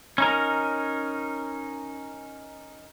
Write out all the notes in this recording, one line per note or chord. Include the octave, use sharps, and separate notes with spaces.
C#4 D#4 A#4